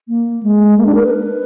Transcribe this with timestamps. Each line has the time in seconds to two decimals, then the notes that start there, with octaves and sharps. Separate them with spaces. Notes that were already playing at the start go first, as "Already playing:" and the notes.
0.08 A#3
0.43 G#3
0.77 A#3
0.86 D4
0.95 A#4
1.03 B4